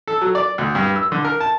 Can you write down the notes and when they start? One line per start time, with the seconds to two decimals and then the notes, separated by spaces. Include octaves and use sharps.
0.07 A4
0.21 F#3
0.35 D5
0.58 D2
0.75 G2
0.96 E6
1.12 D3
1.25 A#4
1.41 A5